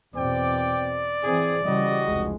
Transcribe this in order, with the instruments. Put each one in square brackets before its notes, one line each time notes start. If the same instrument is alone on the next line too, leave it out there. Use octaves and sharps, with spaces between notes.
[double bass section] E2 B2 C4 [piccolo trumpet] D5 [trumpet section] G5 D6
[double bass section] E3 C4 [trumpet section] G#4
[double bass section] C#3 E3 G3 [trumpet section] F#4 D#5
[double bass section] F1 C#2 G#3